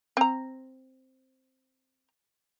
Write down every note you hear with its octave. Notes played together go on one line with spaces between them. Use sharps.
C4 A#5